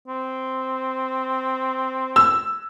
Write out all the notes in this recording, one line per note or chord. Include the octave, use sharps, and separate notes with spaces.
C4
E6